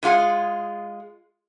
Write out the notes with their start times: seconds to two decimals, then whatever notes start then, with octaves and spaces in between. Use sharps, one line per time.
0.03 E3 G#3 F4 G#4 F#5